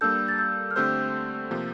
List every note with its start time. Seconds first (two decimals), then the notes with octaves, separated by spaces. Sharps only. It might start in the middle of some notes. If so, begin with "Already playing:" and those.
0.01 G3 A#3 D4 A4 E6 G6
0.28 A6
0.38 E6 G6
0.71 F6
0.76 D3 A3 C4 G4 C5 E6 G6
1.51 C3 F3 A#3